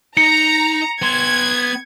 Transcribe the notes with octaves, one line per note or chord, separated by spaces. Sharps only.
D#4 A#5 C#7
B3 C6 G#6